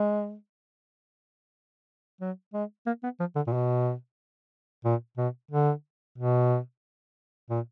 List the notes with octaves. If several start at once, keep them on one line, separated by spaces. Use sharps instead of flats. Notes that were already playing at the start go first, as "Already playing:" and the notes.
Already playing: G#3
F#3
G#3
A#3
B3
F3
D3
A#2
B2
A#2
B2
D3
B2
A#2